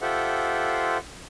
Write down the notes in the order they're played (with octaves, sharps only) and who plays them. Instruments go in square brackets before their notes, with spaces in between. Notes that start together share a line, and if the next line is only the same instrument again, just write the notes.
[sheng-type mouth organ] F4 G4 A4 C5 E5 F#5